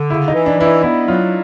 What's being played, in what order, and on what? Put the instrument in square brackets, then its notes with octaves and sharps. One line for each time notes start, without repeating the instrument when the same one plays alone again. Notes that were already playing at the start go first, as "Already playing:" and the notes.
Already playing: [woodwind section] D3
[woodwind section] C#3 [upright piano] E4
[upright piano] D#4
[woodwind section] E3
[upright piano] D4
[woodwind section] E3 [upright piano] E4
[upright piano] D#4
[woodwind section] B3 [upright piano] E4
[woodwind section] F#3 [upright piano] F4